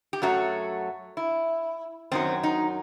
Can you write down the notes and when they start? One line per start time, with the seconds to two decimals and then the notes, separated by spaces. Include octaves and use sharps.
0.13 G4
0.22 F#2 F#3 A3 F#4
1.17 E4
2.12 F#2 D#3 F#3 C4
2.43 D#4